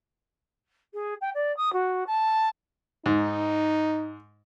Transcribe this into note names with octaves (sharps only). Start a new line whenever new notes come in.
G#4
G5
D5
D#6
F#4
A5
G#2 D#4